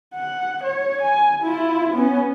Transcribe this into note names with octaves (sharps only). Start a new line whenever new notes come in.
F#5
C#5
G#5
E4 F4
B3 C#4